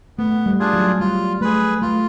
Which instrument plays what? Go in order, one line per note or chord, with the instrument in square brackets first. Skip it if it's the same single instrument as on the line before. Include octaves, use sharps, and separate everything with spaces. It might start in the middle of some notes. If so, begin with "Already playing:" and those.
[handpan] A3 [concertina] B3
[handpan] G3
[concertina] D4 F4 G#4
[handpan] F#3
[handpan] G3 [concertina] F4
[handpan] A3 [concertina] G#4 B4
[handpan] A3 [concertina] F4